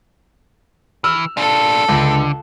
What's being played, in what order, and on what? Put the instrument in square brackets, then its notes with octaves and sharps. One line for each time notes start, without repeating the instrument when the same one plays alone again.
[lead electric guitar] E3 [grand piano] E6 F6
[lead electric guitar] D4 F4 [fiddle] A4
[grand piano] C#2 [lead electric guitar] D3